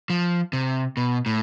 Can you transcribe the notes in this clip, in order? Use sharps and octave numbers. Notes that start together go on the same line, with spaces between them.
F3
C3
B2
A2